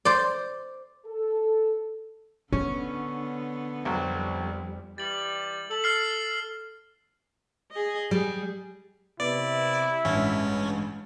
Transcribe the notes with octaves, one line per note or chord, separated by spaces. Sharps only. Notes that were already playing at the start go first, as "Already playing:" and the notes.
C5 D5
A4
D3 B3 C#4 D4
C2 F2 F#3 G3
E3 G3 A6 F#7
A4 F#7
F6 C7
G#4 D#5
G3 G#4
C3 B3 E4 D5
A1 G2 G#3 C#4